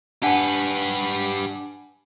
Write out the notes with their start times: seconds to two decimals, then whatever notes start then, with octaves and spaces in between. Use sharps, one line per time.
0.23 D4 G4 B4 F#5 G#5